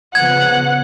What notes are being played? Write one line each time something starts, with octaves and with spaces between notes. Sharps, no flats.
C#3 F3 B3 F#5 G#6